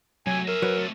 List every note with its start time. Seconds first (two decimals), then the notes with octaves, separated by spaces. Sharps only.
0.27 C3 F#3 A3 G#5
0.48 G#4 A#4 E5
0.62 F#3 B4
0.78 A3 C4 A6